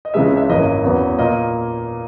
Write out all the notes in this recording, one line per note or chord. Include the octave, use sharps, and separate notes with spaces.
D#5
C#2 C#3 E3 G#3 E5
E5
G#1 F#2 E3 A#3 D#5
E2 C#3 F#3 B3
A#2 A#3 D#5